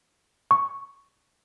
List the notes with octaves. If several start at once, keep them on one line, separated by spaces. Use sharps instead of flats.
C#6